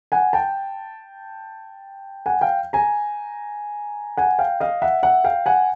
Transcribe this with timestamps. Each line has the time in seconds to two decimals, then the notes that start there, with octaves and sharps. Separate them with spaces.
0.12 F#5 G#5
0.33 G5 A5
2.26 F#5 G#5
2.41 F5 G5
2.73 G#5 A#5
4.17 F#5 G#5
4.39 F5 G5
4.60 D#5 F5
4.82 E5 F#5
5.03 E5 F#5
5.24 F5 G5
5.46 F#5 G#5